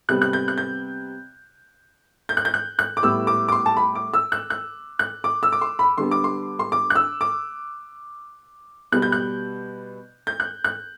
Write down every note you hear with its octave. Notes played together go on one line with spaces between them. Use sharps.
C3 G3 B3 F#6
F#6
G6
F#6
G6
G6
F#6
G6
F#6
F#6
D6
A2 G3 B3 E6
D6
D6
C6
A5
B5
D6
E6
F#6
F#6
F#6
D6
E6
D6
C6
B5
D3 G3 B3 C6
D6
C6
C6
D6
F#6
E6
D6
B2 G3 B3 F#6
G6
F#6
G6
F#6
F#6